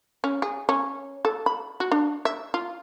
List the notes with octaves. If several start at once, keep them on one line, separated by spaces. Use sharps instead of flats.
C#4
G#4
C#4
A4
B5
F#4
D4
E5
F4